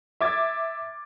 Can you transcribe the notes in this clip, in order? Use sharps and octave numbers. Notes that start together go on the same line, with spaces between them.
E5 D6 G#6 A6